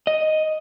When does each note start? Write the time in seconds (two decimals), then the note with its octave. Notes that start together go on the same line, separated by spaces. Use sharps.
0.07 D#5